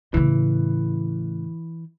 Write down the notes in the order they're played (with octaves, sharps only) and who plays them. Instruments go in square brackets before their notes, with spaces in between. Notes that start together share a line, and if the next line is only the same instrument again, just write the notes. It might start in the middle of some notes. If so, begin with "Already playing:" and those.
[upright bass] A2 C#3 [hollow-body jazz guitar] E3